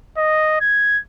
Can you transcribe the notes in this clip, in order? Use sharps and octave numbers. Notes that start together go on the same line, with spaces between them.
D#5
G#6